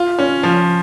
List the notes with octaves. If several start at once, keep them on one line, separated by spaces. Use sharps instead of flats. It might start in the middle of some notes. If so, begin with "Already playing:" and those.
Already playing: F4
C#4
F3